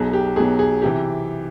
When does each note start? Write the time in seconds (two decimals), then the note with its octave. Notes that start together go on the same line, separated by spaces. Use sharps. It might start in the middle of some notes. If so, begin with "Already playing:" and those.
Already playing: B1 B2 F#3 G#4
0.13 G4
0.36 B1 B2 F#3 G#4
0.59 G#4
0.82 C3 E3 G4